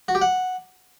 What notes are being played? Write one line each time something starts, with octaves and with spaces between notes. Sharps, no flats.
F#4
G4
F#5